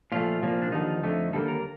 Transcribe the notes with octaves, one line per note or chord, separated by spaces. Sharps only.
A#2 F3 A3 F4
C2 A#2 F3 A#3
D4
D#2 D3 F3 D#4
F2 D3 A3
D#2 D3 G3 A#3 A4
A#4